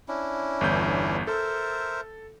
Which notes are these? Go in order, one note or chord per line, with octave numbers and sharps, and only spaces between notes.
C#4 D4 E4
G1 E2 G6
A4 A#4 C5 E5